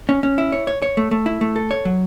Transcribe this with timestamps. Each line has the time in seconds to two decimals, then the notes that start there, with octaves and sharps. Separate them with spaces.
0.09 C#4
0.23 C#4
0.38 E4
0.52 C#5
0.67 C#5
0.82 C#5
0.97 A3
1.11 A3
1.26 E4
1.41 A3
1.56 A4
1.71 C#5
1.85 F#3